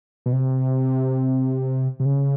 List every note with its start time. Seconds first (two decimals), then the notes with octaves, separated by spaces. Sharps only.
0.26 B2
0.33 C3
2.00 C3
2.05 C#3